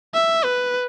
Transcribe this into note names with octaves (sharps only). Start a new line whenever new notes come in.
E5
B4